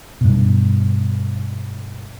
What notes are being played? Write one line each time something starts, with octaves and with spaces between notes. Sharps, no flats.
G2 B2